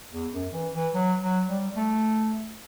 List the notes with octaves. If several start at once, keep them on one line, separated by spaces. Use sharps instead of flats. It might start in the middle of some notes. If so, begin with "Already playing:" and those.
E2
F#2
E3
E3
F#3
F#3
G3
A3